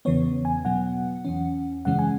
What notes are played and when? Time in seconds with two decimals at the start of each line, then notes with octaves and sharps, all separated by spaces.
0.05 E2 C#3 E3 B3 C#5
0.45 G#5
0.65 B2 F#3 B3 F#5
1.25 E2 E3 C#4
1.85 F#2 C#3 E3 G#3 C#4 F#5
1.99 G#5